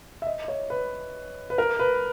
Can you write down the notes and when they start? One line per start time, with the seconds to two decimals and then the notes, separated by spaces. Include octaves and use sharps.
0.22 E5
0.27 D#5
0.48 C#5
0.70 B4
1.50 B4
1.58 A#4
1.79 B4